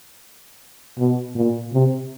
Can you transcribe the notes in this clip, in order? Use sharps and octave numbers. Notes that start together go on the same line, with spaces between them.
B2
A#2
C3